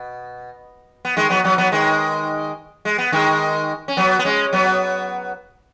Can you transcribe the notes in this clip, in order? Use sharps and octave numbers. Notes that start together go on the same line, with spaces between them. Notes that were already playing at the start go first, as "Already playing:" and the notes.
Already playing: B2
B3
D#3 G#3
F#3 B3
F#3 B3
F#3 B3
D#3 G#3
G#3
B3
D#3 G#3
C#4
F#3 B3
B3
G#3 C#4
F#3 B3